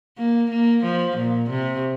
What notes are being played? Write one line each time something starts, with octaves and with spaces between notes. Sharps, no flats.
A#3
A#3
F3
A#2
C3